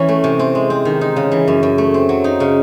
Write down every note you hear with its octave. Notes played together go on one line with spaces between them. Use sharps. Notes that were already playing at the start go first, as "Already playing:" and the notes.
Already playing: E3 C#4
A3
C3
C4
G#3
C4
D#3
D#4
C#3
E3
F#2
F#2
A3
C4
F#3
D#4
C#3